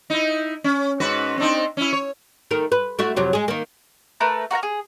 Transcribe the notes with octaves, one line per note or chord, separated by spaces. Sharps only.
D#4 E4
C#4
G#2 F#4 B4
C4 D4 D#4
C#4 E4
C#5
D#3 A3 A#4
B4
A3 E4 F#4
F2 C3 F#3
G#3 G#4
D#3 A#3
A3 A#4 B4
F#4 A#4 F#5 A#5
G#4